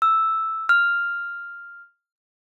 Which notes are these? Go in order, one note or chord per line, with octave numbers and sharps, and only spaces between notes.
E6
F6